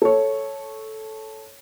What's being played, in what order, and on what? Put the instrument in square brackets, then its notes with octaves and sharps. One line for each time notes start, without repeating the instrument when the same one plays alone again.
[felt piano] A4 C#5